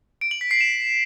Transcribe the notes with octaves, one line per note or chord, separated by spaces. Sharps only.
D7
F#7
B6
C7
E7